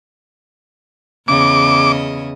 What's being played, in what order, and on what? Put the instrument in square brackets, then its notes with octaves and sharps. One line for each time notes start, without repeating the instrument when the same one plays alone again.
[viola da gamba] E2 C#3 D#5 [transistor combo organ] D6